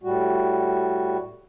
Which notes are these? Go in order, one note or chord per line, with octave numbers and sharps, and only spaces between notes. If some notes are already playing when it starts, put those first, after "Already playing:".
A2 G3 F#4